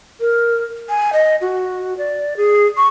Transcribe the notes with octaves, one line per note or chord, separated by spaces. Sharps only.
A#4
G#5
D#5
F#4
D5
G#4
C#6